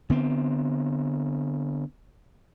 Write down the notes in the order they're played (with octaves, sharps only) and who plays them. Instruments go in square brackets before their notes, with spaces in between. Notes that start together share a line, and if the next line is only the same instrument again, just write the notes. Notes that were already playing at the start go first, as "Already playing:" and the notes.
[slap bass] D3 B3 C4